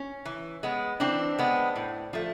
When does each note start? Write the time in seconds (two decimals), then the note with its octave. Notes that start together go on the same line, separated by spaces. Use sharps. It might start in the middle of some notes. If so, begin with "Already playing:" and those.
Already playing: C#4
0.25 E3
0.63 G#3 B3
1.00 E3 C4 D4
1.38 G#3 B3
1.76 A2
2.13 F3 A3